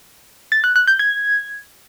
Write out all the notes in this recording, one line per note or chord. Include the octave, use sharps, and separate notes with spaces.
A6
F#6
F#6
G6
G#6